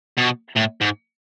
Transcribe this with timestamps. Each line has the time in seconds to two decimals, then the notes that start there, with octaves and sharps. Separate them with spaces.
0.17 B2
0.56 A2
0.81 G#2